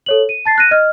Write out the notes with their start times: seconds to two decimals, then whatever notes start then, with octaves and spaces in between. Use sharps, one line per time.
0.06 A4 C#5 F#7
0.29 D#7
0.46 A5 A6 C7
0.58 F#6 A#6 D#7
0.71 D#5 F6